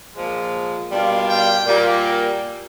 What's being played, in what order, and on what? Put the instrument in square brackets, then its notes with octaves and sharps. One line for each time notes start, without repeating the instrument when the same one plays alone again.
[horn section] A#2 F3 G#3
B2 G3 A#3 D4 F4
G5
A#2 G3 A#3